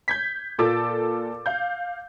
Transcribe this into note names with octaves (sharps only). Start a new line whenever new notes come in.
G6 G#6 B6
A#2 F4 A4 D6 E6 A6
F5 G6